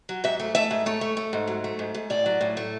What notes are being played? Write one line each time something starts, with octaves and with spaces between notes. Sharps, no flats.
F#3
G#2 E5
A3
A3 E5
G#2
A3 C#5
A3
A3
G#2
F#3
A3
G#2
G#2
A2 D5
F#3
A2
A3